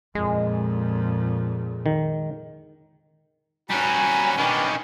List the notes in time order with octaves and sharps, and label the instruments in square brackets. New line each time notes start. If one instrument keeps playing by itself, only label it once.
[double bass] F2 A#2 [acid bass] G#3
[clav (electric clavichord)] D#3
[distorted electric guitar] G3 C#4 [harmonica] F#4 A#5 B5 [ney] G#5
[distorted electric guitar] D#3 C#4 [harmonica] D4 B4 G5